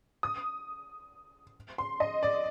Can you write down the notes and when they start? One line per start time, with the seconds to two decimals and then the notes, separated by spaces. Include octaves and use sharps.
0.23 D#6
1.78 C6
2.00 D#5
2.23 D5